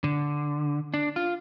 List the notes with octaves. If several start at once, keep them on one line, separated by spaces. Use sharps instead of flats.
D3
D4
F4